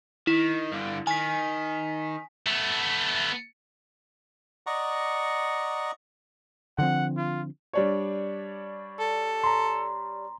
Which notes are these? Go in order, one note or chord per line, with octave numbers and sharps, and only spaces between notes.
D#3 E4
G2 D3
D#3 G#5 B6
A3 B3
D5 D#5 F#5 A#5 C#6
D3 F3 C4 F#5
F4
G3 D4 C#5
A4
A#5 C6